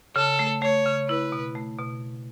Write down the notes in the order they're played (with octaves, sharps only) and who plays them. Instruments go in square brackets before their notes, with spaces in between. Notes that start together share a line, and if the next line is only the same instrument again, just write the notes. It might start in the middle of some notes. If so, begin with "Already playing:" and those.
[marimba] C#3 [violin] A4
[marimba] A3
[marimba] A3 [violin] C#5
[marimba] C#3
[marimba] E4 [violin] B4
[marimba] B2
A3
B2